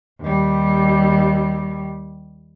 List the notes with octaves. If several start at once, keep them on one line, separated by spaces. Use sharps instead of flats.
D#2 G3